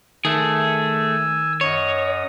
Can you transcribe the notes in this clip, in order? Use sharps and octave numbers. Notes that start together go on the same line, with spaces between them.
D#3 A3 G#4 G#5 E6
F#2 C#5 D#5 D#6